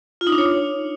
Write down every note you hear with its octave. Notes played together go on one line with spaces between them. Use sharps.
F4
D#4
D4
C#5